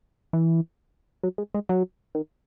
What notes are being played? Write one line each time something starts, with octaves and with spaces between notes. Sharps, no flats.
E3
F#3
G#3
G#3
F#3
D#3